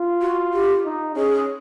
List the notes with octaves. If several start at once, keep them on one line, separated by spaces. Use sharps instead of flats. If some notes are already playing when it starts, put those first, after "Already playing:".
Already playing: F4
F#4
G4
D#4
C#4 G#4